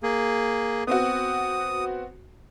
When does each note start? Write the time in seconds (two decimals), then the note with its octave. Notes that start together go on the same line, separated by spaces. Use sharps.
0.03 A#3 G#4
0.87 B3 C4 F#4 D#6